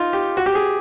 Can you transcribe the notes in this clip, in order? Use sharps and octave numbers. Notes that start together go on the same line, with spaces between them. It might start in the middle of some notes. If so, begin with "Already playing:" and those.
Already playing: D#4 F4
G4
F#4
G4
G#4